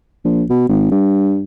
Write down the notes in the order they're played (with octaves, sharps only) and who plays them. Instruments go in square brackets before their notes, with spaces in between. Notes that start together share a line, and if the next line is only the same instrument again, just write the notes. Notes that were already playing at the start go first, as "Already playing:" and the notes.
[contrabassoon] A#1
B2
G#1
G2